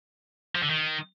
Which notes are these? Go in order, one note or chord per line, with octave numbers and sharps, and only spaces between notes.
F3
D3
D#3